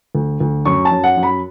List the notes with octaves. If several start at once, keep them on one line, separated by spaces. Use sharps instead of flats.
D2
D2
F#2 C#6
A5
F#2
F#5
F#2
B5